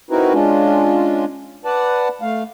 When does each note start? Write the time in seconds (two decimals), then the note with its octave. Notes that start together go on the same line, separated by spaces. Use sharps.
0.11 C4 D#4 E4 F#4 A#4 B4
0.33 G#3 C#4 D4 F4
1.65 B4 D5 F#5 A5
2.21 A3 F5